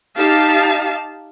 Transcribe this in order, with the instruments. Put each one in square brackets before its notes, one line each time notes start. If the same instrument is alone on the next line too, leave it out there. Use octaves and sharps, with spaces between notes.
[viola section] D#4 G4 F5 A5